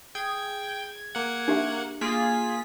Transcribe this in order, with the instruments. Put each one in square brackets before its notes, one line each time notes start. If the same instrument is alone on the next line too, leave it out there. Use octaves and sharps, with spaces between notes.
[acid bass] G#4 [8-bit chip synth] G5 [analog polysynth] G#6
[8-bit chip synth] A#3 F#5
[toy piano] D4 G4 E5
[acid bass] A#3 [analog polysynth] F4 G#4 [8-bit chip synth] B6